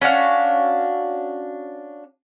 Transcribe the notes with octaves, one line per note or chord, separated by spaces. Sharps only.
C#4 D4 F#4 F5